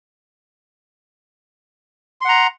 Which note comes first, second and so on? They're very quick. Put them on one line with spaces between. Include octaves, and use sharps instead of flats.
C6 F#5 A#5